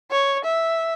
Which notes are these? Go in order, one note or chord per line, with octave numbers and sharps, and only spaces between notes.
C#5
E5